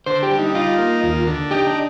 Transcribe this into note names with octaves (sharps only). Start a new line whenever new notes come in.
D3 C5
G4
G3
D#4
D#4 F4
A#3
D#2
D3
D#4 G4
D4